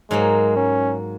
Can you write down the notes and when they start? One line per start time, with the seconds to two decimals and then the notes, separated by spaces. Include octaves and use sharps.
0.11 G#2 F#3 G#3 A#3
0.56 C#4